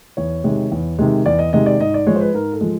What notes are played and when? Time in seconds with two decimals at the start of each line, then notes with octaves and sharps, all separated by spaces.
0.17 E2 C#5
0.44 C3 D#3 G#3
0.72 E2
0.99 C3 D#3 G#3
1.26 E2 D5
1.39 D#5
1.53 C3 D#3 G#3 D#5
1.66 D5
1.80 G#2 D#5
1.94 D5
2.07 F3 G#3 C#5
2.16 C5
2.21 B4
2.34 G#2 A#4
2.53 A4
2.61 F3 G#3